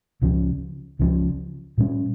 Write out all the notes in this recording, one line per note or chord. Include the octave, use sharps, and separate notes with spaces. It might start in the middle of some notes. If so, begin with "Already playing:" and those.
C#2 C#3 F3 C#4
C#2 C#3 F3 C#4
A#2 G3 C#4